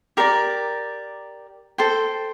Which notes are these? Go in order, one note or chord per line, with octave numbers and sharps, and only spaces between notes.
G4 A#4 D5
A4 C5 G5